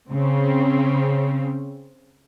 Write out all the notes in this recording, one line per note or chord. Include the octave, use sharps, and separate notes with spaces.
C#3 C4